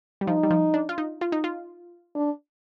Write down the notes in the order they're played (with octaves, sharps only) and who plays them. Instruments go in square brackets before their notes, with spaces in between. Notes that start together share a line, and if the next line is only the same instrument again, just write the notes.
[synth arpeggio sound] G3
[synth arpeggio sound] F3 [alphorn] D#4
[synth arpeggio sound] G3
F3
D4
F4
D#4
F4
D#4
F4
[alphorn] D4